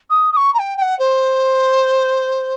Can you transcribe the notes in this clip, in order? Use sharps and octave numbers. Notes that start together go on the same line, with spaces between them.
D#6
D#6
C#6
A#5
G5
G5
F#5
C5